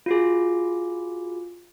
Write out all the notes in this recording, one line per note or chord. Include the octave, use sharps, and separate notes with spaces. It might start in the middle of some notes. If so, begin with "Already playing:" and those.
F4 F#4 G#4